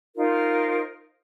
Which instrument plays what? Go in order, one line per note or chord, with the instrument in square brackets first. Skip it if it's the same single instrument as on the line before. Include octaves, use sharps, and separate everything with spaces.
[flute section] D#4 F4 A#4 C5